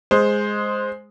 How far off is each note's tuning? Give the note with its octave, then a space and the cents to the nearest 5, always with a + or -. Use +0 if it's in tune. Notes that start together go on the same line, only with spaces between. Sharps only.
G#3 +0 C5 +0